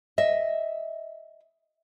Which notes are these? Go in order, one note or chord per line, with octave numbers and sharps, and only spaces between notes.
D#5 E5